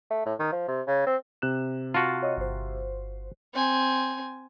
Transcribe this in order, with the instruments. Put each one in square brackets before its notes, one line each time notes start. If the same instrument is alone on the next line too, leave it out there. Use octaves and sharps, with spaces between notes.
[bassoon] A3
A2
D#3
F3
C3
C#3
C4
[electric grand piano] C3 F#6 E7
[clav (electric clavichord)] F4 F#4 [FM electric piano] A5
[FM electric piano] C#5 D#5
G1 C5
[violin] C4 G#5